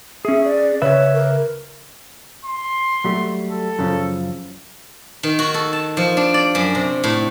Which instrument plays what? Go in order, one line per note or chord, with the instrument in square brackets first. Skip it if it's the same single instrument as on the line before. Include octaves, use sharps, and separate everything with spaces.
[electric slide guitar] C#4 G#4 [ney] E5
[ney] D5
[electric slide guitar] C#3 B4 E5 [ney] C#5
[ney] A#4
[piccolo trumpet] C6
[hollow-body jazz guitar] F#3 G3 A3
[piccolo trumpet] A4
[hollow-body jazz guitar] F#2 C#3 F3
[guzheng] D#3
F#4
A4
A5
F3
D4
D5
F#2
C3
A2